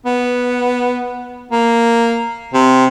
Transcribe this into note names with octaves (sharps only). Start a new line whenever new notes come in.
B3
A#3
C3